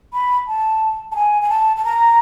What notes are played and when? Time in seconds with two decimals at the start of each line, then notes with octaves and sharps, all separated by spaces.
0.13 B5
0.47 A5
1.12 A5
1.16 G#5
1.42 G#5
1.50 A5
1.77 A5
1.85 A#5